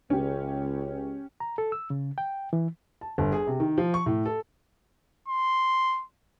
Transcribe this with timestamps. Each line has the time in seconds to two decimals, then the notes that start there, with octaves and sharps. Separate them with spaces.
0.10 C#2 C#4 G4
1.40 A#5
1.58 A4
1.72 E6
1.90 C#3
2.18 G5
2.53 E3
3.01 A5
3.18 G1
3.32 G#4
3.47 C3
3.60 D#3
3.78 F3
3.94 C#6
4.06 A2
4.25 A4
5.28 C6